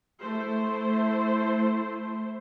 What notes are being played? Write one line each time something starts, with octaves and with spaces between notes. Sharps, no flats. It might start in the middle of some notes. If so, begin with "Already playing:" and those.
A3 E4 C5